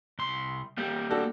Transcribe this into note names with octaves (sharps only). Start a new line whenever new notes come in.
C2 C6
G3 A#3 G4
D4 F#4 A4